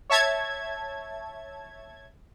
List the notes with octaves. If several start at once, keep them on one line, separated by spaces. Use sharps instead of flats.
C#5 E5 A5 G#6